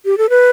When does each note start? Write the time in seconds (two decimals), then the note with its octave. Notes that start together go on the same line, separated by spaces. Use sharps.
0.05 G4
0.18 A4
0.30 B4